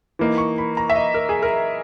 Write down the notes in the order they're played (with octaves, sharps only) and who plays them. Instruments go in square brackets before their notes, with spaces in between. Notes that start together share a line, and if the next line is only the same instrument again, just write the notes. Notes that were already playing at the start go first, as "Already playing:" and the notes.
[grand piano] E3 A#3 D#4
C#6
B5
A#5
E5
D#5
A#4
G#4
A#4